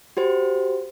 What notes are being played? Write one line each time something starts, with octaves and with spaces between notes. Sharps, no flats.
F#4 G4 C5